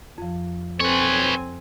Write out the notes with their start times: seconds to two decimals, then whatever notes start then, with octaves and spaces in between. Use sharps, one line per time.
0.18 F2 F3
0.80 C4 A4 B4 C#5 G#5